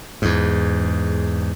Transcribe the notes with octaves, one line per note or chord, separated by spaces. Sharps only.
E2 G#2